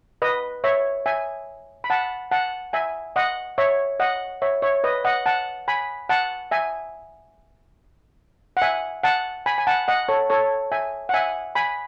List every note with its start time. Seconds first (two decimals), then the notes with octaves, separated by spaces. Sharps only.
0.22 B4 D#5
0.64 C#5 E5
1.06 E5 G#5
1.84 B5
1.90 F#5 A5
2.31 F#5 A5
2.73 E5 G#5
3.16 D#5 F#5
3.58 C#5 E5
4.00 D#5 F#5
4.42 C#5 E5
4.62 C#5 E5
4.84 B4 D#5
5.04 D#5 F#5
5.26 F#5 A5
5.68 G#5 B5
6.09 F#5 A5
6.51 E5 G#5
8.57 F#5
8.62 E5 G#5
9.03 F#5 A5
9.46 G#5 B5
9.58 G#5
9.67 F#5 A5
9.88 D#5 F#5
10.08 A4 C#5
10.30 A4 C#5
10.72 E5 G#5
11.09 F#5
11.14 E5 G#5
11.55 G#5 B5